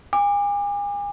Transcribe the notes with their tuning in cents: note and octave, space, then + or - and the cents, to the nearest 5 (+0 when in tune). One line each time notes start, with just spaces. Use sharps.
G#5 -35 D6 +20